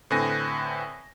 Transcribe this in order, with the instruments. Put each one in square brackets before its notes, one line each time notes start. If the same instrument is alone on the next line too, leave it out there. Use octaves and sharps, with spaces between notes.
[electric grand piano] A2 D3 C4 B4 G#5 A#6